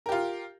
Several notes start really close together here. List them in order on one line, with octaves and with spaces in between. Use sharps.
A#4 G4 F4